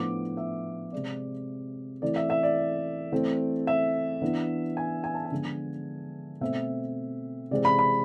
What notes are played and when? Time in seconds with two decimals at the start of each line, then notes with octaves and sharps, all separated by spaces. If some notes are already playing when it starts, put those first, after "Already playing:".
Already playing: A2 F3 B3 D4 D6
0.37 E5
0.92 C3 G#3 C4 D5
2.02 E3 A3 C4 D5
2.16 E5
2.30 E5
2.43 D5
3.12 E3 A3 C4
3.67 E5
4.22 E3 B3 D4
4.77 G#5
5.04 G#5
5.14 A5
5.25 G#5
5.32 D3 F3 G#3 B3 D4
6.41 B2 A3 C4 E5
7.51 C3 E3 G#3 C4 D5
7.65 B5
7.79 B5